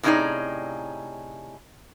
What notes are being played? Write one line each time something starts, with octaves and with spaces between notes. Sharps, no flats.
A2 C3 C#4 D#4 G#4 D5